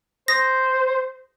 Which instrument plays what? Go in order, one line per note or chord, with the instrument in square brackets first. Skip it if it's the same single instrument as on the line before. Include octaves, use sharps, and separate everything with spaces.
[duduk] C5 [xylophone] D#6 A#6